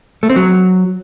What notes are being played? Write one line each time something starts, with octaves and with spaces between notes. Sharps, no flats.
A3
C4
F#3